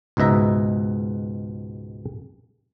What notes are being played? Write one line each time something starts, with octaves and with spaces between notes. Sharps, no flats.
C#2 G#2 B2 D#5 E5 A#5